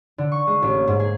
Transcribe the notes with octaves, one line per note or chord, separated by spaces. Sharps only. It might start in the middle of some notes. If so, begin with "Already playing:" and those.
D3
C#6
G#3
A1
A#3
G#2
G#4